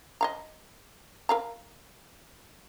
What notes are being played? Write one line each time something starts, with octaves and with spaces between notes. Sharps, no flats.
D#5 F5 A#5
A#4 F5 A#5